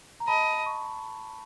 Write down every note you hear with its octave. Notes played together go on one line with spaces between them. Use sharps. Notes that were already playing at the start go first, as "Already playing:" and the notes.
A#5
D#5 A5 B5
C#6